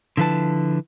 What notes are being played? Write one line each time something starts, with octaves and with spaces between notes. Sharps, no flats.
D3 F3 E4 B4 A5